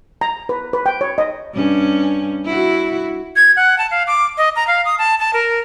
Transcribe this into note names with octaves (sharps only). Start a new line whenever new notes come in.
A#5
B4
B4
G5
C#5
D#5
G2 C#4
E4 F#4
G#6
F#5
A5
F5
D6
D#5
A#5
F5
D#6
A5
A5
A#4